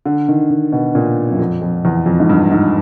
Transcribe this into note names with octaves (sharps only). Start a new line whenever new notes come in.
D3
D#3
D#3
B2
A#2
F#2
F2
F2
E2
F2
G#2
G2
G#2